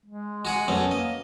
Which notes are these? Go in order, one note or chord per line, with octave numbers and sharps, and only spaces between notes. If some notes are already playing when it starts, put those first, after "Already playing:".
G#3
F#4 G#4 F#5
F#2 A3 B3 C#4
A#3 D#5